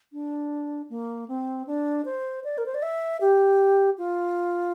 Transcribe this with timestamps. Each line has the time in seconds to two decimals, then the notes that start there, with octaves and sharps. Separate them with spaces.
0.13 D4
0.90 A#3
1.28 C4
1.67 D4
2.05 C5
2.44 D5
2.58 A#4
2.66 C5
2.74 D5
2.82 E5
3.21 G4
3.98 F4